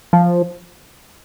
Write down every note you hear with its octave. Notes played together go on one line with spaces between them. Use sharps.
F3